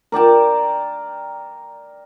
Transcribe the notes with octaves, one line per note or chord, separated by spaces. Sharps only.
A#4 D5 G5 A5